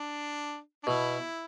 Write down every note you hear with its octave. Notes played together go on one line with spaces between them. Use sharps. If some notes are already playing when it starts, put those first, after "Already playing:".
Already playing: D4
D4
B2 E4